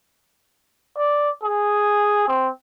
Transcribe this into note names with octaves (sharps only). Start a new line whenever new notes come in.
D5
G#4
C4